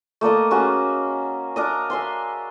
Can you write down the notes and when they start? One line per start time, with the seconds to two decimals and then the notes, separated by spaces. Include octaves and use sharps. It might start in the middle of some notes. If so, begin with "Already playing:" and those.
0.21 A3 A#3 D5 D#5
0.51 A#3 C#4 F#4 G#4
1.56 D4 A#4 D#5
1.90 E5 G#5 C6